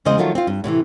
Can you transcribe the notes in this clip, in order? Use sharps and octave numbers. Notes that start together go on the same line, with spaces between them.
E2 C#3 G#3 C5 D#5
D#3 F3 F#3 A3 F4
C4 F4
G2
A2 C3 D#3 E3